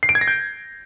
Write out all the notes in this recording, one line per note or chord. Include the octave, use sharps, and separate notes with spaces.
C7
D7
G#6
A#6
G6